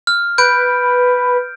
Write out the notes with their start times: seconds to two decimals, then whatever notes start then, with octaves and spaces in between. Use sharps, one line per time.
0.07 F6
0.38 B4 G6 D7